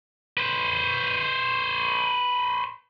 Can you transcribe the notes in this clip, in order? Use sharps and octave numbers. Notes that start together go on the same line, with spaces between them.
B4 C5